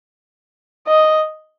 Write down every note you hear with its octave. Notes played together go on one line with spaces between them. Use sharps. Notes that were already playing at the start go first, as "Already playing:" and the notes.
D#5